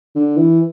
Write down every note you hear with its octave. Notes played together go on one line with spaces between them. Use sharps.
D3
E3